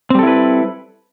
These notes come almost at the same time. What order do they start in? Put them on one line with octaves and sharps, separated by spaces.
C4 G3 A4 E4 B4